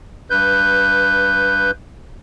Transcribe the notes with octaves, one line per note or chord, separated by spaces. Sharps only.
G2 B4 G6